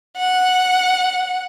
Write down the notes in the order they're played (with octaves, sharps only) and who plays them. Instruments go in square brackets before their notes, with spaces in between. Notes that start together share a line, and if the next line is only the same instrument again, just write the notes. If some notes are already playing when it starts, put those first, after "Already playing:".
[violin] F#5